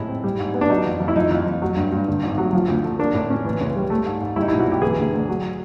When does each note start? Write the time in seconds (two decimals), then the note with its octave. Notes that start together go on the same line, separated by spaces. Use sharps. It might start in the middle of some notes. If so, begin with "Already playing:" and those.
Already playing: A2 G#3 E4
0.08 C4
0.24 G3
0.39 G#2
0.54 B3
0.61 D4
0.70 F#3 D#4
0.85 F2
1.00 F2
1.08 E4
1.16 F3 D#4
1.31 F2
1.46 F2
1.62 F#3
1.76 G2
1.92 G2
2.08 D3
2.23 G#1
2.38 F#3
2.53 F3
2.68 D2
2.84 A3
2.99 A#3 D4
3.14 A2
3.30 C#4
3.45 E3
3.61 C#2
3.76 G3
3.90 A3
4.06 G#2
4.21 G#2
4.36 G3 E4
4.42 D#4
4.48 B1 E4
4.60 F#4
4.67 B1 G4
4.82 E3 G#4
4.97 D2
5.13 D2
5.29 F#3